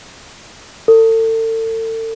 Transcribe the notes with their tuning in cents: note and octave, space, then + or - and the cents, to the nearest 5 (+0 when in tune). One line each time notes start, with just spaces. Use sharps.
A4 +35